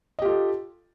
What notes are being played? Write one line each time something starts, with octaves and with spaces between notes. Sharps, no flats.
F4 G4 A4 D#5